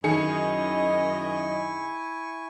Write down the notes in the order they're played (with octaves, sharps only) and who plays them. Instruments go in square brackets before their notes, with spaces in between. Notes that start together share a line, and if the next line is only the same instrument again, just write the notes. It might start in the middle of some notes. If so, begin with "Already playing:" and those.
[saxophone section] F#2 D#5 [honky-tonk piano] D#3 G#4 C#7 [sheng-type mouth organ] E4 G#5 C#6